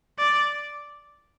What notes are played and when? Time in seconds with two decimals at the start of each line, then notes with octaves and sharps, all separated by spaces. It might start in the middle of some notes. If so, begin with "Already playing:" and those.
0.19 D5